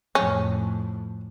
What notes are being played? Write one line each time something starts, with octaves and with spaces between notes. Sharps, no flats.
F2 A2 C#4